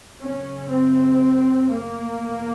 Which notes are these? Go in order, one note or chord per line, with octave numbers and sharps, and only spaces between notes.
F#2 C#3 C#4
C4
A#3
E2 B2